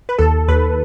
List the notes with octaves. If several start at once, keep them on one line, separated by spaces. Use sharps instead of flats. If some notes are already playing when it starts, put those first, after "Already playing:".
B4
D#2 A4
D#2 B4